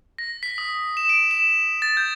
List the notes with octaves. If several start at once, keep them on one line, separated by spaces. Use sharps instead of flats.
A#6
B6
D#6
E7
D7
E7
A6
G6